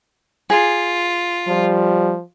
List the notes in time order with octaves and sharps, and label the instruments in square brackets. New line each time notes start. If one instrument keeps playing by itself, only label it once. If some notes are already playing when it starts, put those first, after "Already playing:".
[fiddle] F4 [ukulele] G#4
[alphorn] F3 [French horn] G3